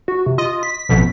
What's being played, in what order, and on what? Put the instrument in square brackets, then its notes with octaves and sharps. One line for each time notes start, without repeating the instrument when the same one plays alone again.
[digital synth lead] F#4
C3
[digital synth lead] F4 [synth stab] D#5
[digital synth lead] B6
[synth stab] A1 F2 B2